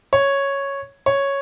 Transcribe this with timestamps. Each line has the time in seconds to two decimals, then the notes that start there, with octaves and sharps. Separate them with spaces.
0.13 C#5
1.06 C#5